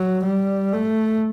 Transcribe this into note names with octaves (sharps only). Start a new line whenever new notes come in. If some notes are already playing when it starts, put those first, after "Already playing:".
Already playing: F#3
G3
A3